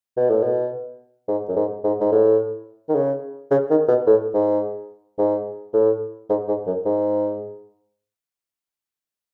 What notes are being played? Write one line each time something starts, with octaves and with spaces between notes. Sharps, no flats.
B2
A2
B2
G#2
F#2
G#2
G#2
G#2
A2
D#3
C#3
C#3
D#3
B2
A2
G#2
G#2
A2
G#2
G#2
F#2
G#2